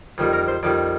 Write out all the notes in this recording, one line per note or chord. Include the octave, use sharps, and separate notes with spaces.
F2 D#3 G3
A#4
C5
F2 D#3 G3 D5